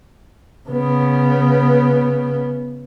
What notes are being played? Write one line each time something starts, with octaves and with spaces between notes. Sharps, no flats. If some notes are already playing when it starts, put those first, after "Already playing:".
C#3 B3